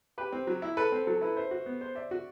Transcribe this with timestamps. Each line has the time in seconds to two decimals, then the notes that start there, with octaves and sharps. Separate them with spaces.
0.18 G4 B4
0.32 C4
0.47 F#3
0.62 E4
0.77 A4 B4
0.92 C4
1.07 F#3 A4
1.21 E4 B4
1.37 C5 E5
1.51 F#4
1.66 B3
1.81 C5
1.95 D5 E5
2.11 F#4